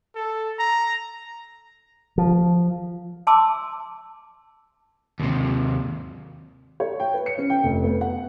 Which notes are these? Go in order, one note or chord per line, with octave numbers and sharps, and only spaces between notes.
A4
A#5
F3
G#5 A5 C6 D6 E6
D#2 C3
C#5
G5
B4
C#7
C#4
G5
F1
B3
F#5